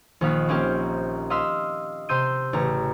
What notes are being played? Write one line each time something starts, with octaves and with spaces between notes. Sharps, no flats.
A#1 D#3 D#4 F5 F#6 B6
A#3 C4 C#4 G4 A#4
D#5 F5 C6 E6 B6
C3 C6 E6 G6 D#7
A1 C#3 A#5